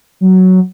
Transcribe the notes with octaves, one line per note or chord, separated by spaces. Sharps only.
F#3